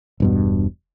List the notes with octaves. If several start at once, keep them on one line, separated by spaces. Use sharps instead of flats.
E1 G2 B2